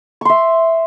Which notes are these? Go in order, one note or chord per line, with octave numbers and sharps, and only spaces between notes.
E5 C6 C#6